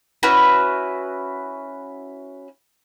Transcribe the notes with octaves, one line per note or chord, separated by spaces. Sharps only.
C#4 E4 F#4 B4